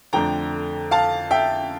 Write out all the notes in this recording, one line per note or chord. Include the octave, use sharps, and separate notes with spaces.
F2 D3 A3 D4 G5 A#5
F5 A5
E5 G5